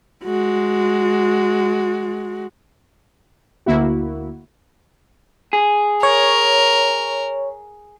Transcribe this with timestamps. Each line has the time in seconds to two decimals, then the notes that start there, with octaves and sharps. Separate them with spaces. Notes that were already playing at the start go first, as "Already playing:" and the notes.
0.24 G#3 F#4
3.66 D2 A#3 E4 F#4
5.53 G#4
6.03 A#4 C#5